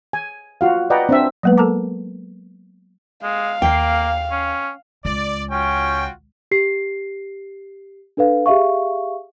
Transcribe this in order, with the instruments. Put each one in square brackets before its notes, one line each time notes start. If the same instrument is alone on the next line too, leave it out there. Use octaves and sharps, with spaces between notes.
[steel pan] G#5
F4 F#4 F5
B4 D5 D#5 F#5 G5 A#5
C4 D4 E5
[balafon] F#3 G#3 A#3 B3 B4
A4 A#4 A5 A#5 D6
[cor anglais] G#3 [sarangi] F5
[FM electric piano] D#2 C7 [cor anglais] A#3 [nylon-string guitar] G5
[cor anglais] C#4
[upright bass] C#2 [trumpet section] D5
[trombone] C#4 [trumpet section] F4 F#4 G5
[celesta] G4 C7
D4 A4 B4 F5
G4 G#4 E5 F5 C#6